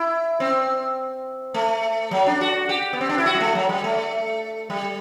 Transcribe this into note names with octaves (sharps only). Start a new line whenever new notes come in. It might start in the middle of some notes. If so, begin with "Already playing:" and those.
Already playing: E4
C4
A3
F#3
D4
F#4
G4
B3
C4
D4
E4
F#4
G3
A3
F#3
G3
A3
G3